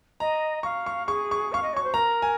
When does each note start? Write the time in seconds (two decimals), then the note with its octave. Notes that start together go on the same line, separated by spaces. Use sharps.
0.20 D#5 A#5
0.63 F5 C#6
0.86 C#6
1.07 G#4 C#6
1.31 C#6
1.52 F5 C#6
1.63 D#5
1.73 C#5 C#6
1.83 C5
1.94 A#4 A#5
2.22 G#5